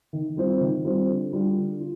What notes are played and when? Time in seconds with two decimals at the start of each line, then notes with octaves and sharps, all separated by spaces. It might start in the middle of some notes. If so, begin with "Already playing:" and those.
0.13 D#3
0.36 G3 C4 F4 C5
0.61 D#3
0.85 G3 C4 F4 C5
1.08 D3
1.33 G3 D4 F4
1.56 D3
1.80 F4